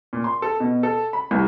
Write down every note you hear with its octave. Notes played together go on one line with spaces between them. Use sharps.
A#2
C6
A4
B2
A4
B5
C2